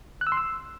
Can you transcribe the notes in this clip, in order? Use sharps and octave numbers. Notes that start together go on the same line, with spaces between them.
F#6
E6
C6
E6